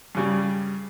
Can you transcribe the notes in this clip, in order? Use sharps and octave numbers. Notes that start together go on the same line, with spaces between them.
G2 C#3 G3